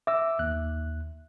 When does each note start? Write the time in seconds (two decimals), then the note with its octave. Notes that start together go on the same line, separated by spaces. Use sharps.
0.07 E5 D6 E6
0.39 D#2 F#6